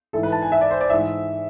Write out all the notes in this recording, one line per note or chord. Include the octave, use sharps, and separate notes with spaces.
G#2 E3 A4
B4
A5
G#5
E5
D5
C5
D5
G#2 E3 E5